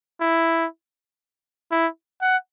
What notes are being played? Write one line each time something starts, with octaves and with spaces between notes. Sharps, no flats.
E4
E4
F#5